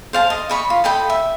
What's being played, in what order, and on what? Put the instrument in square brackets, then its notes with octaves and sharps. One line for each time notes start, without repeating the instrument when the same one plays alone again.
[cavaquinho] C5 F5 A5
D#5
D#5 B5 C#6
F4
A4 D#5 G5 B5
E5